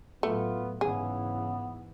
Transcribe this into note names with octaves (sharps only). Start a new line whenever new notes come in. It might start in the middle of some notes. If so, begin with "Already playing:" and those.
A2 F#3 A3 B3 F4
G#2 C#3 E3 B3 G#4